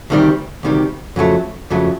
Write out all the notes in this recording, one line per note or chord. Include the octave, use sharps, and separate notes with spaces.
D2 C3 D#3 G3
D2 C3 D#3 G3
F2 C#3 F#3 A3
F2 C#3 F#3 A3